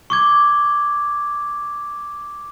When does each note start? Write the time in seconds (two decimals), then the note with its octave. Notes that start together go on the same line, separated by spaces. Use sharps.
0.10 C#6 D6 G#6